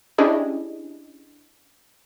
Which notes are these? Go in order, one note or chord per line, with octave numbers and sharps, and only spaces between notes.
C#4 D4 E4 G4 G#4 D#5